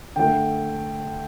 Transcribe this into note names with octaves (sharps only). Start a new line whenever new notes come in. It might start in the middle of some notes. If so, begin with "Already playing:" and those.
D3 A3 G5